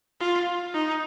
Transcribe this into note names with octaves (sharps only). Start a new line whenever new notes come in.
F4
D#4